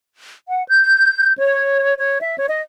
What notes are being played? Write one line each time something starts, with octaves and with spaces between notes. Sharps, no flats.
F#5
G6
C#5
C#5
E5
C#5
D#5